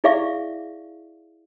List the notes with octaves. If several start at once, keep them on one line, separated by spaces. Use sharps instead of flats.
E4 G#4 D5 E5 F5 C#6